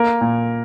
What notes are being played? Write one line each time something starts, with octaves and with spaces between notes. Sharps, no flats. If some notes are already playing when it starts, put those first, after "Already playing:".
Already playing: A#3 A#4
A#2